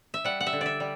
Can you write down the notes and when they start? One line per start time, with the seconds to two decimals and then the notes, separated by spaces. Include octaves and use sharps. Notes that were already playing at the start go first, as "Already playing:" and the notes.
0.14 E5
0.24 G3 F#5
0.41 F#5
0.46 E5
0.53 D3
0.61 D5 E5
0.80 G3